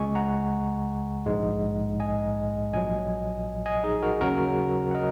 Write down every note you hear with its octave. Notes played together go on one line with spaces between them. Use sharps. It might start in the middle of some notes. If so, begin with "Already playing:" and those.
Already playing: C#2 C#3 G#3 G#5 C#6
F#5 A#5
A#1 G#2 G#3
D#5 G#5
A#1 A#2 F#3 D#5 G#5
D#5 G#5
D#4 G#4
F#4 A#4
D#2 C#3 F#3 F#4 A#4
F#5
A#4 D#5